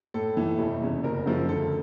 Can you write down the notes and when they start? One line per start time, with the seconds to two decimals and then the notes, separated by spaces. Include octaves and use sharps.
0.14 A2 A4
0.37 E3 A3
0.59 F1
0.82 E2 C#3
1.03 F#1 A#4
1.26 F#2 C#3 F3
1.49 D2 A4